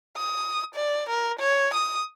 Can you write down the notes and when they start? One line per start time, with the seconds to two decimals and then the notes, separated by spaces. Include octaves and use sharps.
0.17 D#6
0.75 D5
1.09 A#4
1.40 C#5
1.74 D#6